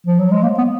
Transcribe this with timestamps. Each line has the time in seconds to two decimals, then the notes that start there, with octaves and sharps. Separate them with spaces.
0.07 F3
0.19 F#3
0.31 G#3
0.43 A#3
0.58 B3